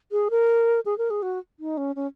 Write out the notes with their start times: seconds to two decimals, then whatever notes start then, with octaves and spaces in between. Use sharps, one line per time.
0.12 G#4
0.30 A#4
0.86 G#4
0.98 A#4
1.10 G#4
1.22 F#4
1.60 D#4
1.77 C#4
1.96 C#4